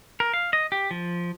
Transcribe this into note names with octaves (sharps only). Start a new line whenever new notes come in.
A#4
F5
D#5
G4
F3